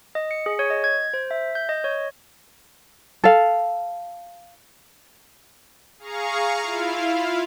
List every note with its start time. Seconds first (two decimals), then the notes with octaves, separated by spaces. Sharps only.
0.15 D#5
0.31 C#7
0.46 G#4
0.59 C#5
0.70 D#5
0.84 G#6
1.14 C5
1.31 E5
1.55 G6
1.69 D#5
1.84 C#5
3.24 A4 F5
5.99 G#4 F5 A#5 C#6
6.62 E4 F4 F5